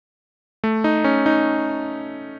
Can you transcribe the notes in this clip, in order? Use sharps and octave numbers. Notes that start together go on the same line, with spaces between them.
A3
D#4
C#4
D#4